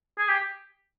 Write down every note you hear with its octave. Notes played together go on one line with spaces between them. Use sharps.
G#4
G4